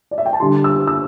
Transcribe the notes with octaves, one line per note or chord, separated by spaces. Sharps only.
D5
E5
G5
A5
D3 G3 C6
E6
E6